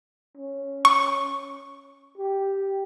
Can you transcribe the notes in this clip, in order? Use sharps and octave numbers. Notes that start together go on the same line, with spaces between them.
C#4
C#6
G4